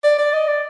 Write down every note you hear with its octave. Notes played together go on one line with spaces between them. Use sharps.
D5
D5
D#5
D5